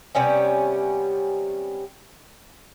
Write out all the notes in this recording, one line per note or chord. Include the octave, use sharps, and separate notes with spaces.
C3 G3 B3 C#4